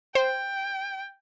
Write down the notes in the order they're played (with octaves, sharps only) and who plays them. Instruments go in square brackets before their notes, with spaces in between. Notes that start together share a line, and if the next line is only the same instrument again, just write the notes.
[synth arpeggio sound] C5 [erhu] G5